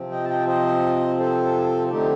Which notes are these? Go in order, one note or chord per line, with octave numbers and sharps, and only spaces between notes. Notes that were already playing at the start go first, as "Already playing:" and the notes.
Already playing: C3 F3 C4
D#5 G5
A5
D#5 G5
C5 D#5
A4 C5
D3 A3 C4 D#4 G4